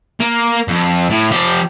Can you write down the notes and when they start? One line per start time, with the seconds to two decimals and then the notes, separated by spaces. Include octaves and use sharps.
0.20 A#3
0.68 F2
1.10 A2
1.31 F3 G4